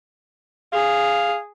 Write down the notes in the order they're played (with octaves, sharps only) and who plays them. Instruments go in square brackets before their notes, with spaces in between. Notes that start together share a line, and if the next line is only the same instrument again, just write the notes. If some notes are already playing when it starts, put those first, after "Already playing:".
[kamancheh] G#4 [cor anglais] F5